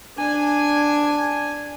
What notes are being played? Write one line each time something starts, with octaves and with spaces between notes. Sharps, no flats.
D4 G#5